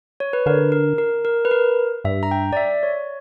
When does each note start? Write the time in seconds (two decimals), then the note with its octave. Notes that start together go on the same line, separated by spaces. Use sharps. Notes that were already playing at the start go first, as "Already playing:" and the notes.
0.20 C#5
0.33 B4
0.46 D3 A#4
0.72 A#4
0.98 A#4
1.25 A#4
1.45 B4
1.51 A#4
2.04 G2 E5
2.23 A#5
2.31 G5
2.53 D5
2.57 E5
2.83 C#5